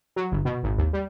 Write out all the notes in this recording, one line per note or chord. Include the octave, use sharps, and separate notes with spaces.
F#3
G1
B2
G#1
D#2
G3